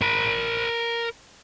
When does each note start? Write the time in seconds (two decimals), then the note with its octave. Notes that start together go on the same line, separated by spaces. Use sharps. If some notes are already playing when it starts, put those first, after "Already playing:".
0.02 A#4 B5